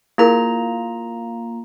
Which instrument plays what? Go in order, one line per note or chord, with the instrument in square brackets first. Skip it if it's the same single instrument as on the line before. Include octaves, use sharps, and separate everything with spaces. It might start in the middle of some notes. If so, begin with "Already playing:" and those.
[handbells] A#3 F4 A#5 [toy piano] E4 G#4 A#4